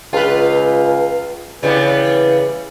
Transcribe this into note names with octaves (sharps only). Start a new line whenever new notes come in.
C#2 F4 B4
C#3 E3 G3 B3